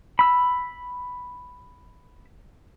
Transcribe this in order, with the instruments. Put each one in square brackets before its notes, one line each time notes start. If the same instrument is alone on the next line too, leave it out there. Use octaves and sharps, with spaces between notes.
[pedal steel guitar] B5 E6